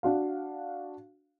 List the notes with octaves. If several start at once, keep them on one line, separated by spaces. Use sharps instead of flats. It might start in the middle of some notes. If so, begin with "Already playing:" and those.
D4 F#4 F5